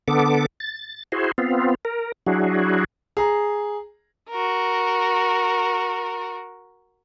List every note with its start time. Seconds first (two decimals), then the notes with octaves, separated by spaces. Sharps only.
0.08 D3 B3 A4 D6
0.60 A6
1.12 E4 F#4 G#4 C5
1.38 B3 C4 F4
1.85 A#4
2.27 F#3 D4 E4 F#4 G#4
3.17 G#4 A#5
4.30 F#4 A#4